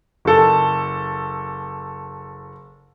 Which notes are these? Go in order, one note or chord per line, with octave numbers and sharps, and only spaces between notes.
F#1 A4